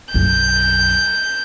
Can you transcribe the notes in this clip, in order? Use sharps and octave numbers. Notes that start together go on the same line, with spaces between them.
B1 F#2 G6